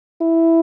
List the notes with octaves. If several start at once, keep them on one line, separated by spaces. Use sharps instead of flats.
E4